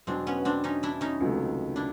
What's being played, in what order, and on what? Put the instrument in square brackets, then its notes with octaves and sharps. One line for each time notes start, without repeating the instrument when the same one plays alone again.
[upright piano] E2 B2 F#3 [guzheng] C4 D4
[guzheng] B3 C#4
C4 D4
C#4 D#4
D4 E4
C#4 D#4
[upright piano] C#2 C3 D#3 F#3 A3
[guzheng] D4 E4